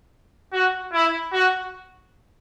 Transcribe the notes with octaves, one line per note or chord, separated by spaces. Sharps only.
F#4
E4
F#4